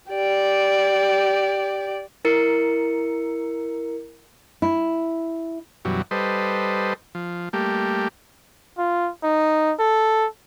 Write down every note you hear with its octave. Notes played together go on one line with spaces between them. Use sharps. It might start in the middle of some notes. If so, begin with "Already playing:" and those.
G4 D5
E4 A#4 C#7
E4
F#2 B2 E3 F#3 G3
G3 A4 B4 C5 D#5
F3
G3 A3 A#3 G4
F4
D#4
A4